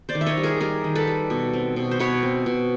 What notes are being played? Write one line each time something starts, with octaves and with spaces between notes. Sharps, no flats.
C5 D5
D#3
E5
C#5 D#5
G3
G#4 A#4
G3 G#4 A#4
D#3
A4 B4
G3
B2
C4
B2
C5
B2 B4 C#5
C4
B2